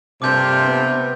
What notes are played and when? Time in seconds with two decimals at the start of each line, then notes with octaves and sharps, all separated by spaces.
0.22 G2 C3 A3 A#3 F4 D6 G6
0.66 B3